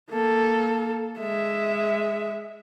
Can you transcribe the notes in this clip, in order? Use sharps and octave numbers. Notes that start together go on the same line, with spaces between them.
A#3 A4
G#3 E5